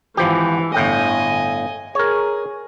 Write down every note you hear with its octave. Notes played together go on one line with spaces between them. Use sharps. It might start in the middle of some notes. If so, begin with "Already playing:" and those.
G#1 E3 F3 G4
G1 A2 D#5 G5 G#5
G#4 A#4 C#5